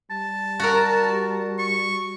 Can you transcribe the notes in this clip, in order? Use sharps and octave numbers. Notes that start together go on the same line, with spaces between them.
G3 A5
F#4 A#4
C#6